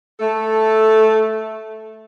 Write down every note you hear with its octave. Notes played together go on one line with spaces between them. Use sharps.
A3 A4